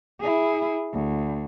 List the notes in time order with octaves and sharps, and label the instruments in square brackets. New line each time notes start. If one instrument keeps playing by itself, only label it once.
[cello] E4 G#4
D2